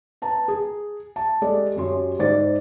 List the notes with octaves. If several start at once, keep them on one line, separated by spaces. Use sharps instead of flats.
B4 A5 A#5
G#4
A5
G#3 G4 A4 D5
F#2 C#4 G4 C6
G#2 C5 D5 A6